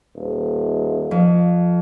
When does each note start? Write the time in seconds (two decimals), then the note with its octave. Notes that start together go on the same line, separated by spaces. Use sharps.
0.16 D#1
1.11 F2